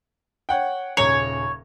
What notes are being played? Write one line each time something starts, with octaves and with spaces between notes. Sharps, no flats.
C#5 F#5 G5
D#1 C#3 C#5 A#5